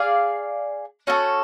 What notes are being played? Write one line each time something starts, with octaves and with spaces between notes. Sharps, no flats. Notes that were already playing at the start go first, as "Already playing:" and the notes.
Already playing: G#4 D5 F5
C#4 F#4 A4